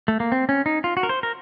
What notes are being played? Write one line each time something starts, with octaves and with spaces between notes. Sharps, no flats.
A3
A#3
C4
C#4
D#4
F4
F#4
A#4
C5
A#4